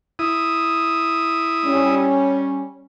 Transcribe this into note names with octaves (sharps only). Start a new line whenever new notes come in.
E4 D#6
G3 C#4